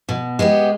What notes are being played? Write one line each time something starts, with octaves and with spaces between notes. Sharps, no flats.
B2
G#3 B3 G4